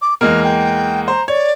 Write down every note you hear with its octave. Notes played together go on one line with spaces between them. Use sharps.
D6
E2 G#3 A#3 F6
G5
C5 A#5
C#5 D5